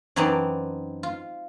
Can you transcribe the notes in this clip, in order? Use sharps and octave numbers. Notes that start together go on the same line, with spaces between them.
F#2 E3 C4 D#4 D5 A5
F4